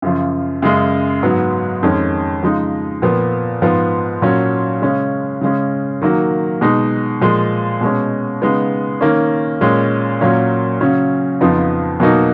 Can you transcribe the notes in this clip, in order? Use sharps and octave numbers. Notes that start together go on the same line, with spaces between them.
F#2 C#3 F3
F#2 C#3 G#3
G#2 F#3 B3
F2 D#3 G#3 C#4
C#3 F3 G#3 D#4
A#2 F3 B3
G#2 F3 B3
A#2 F#3 C#4
C#3 G#3 C#4
C#3 G#3 C#4
D#3 F#3 A#3
B2 G#3 D#4
A#2 F3 G#3
B2 G#3 C#4
C#3 G#3 B3 D#4
D#3 A#3 C#4
A#2 G#3 C#4
A#2 F#3 A#3 C#4
C#3 F#3 C#4
F2 C#3 F3 B3 D#4
B2 F#3 A#3 D#4